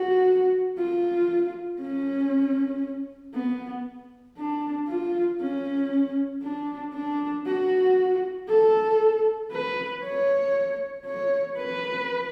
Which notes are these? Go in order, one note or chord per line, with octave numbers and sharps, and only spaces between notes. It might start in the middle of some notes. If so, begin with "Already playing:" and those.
Already playing: F#4
F4
C#4
B3
D4
F4
C#4
D4
D4
F#4
A4
B4
C#5
C#5
B4